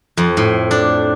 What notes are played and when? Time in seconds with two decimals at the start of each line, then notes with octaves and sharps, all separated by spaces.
0.17 F2
0.37 A2
0.71 D4